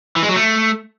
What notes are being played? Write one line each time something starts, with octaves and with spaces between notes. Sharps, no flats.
E3
G#3
F#3
A3